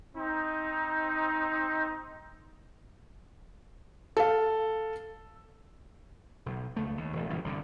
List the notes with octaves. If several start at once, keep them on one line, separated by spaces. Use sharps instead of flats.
C4 D#4
A4 F5
B1
C#2 A3
D#2
E1 A1
F#1 F#2 A#2 E3
C2 G2 D3